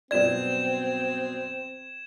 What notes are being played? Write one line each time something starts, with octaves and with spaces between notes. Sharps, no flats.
G2 B2 F#3 C4 D5 G#6 E7